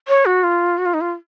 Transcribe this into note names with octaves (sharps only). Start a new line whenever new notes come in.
C#5
F#4
F4
F#4
F4
D#4
F4